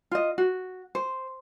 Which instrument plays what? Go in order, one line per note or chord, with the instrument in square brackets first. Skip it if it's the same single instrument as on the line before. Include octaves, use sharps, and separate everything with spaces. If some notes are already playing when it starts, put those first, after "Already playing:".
[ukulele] F4 D#5
F#4
C5